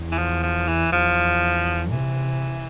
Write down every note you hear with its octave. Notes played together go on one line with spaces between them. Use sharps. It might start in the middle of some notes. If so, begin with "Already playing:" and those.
Already playing: E2
E3
F3
F3
E3
E2 F3
C3 E3